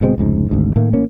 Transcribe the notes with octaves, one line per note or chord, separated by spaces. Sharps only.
G1 B2 G#3 C4
F1 C#2 G#2
G#1 D2 G#2
A2 D#3 A3 A#3
A1 A#3 C#4